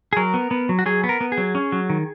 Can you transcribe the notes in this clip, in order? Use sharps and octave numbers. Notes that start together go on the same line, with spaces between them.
G#4
F#3 A#4
B3
B3
F#3
F#4
F#3 G#4
B3
A#4
B3
G#4
F#3
C#4
F#3
D#3